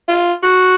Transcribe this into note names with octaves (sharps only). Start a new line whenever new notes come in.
F4
F#4